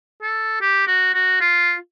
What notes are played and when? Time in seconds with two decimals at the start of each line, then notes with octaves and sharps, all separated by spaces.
0.22 A4
0.61 G4
0.87 F#4
1.14 F#4
1.40 F4